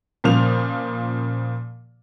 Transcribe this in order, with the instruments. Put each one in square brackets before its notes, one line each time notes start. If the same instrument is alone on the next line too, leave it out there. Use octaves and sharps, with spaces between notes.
[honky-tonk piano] A#2 C#3 F3 F7